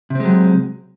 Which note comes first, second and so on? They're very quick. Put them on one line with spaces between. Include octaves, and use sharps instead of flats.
C3 C4 G#3 F#3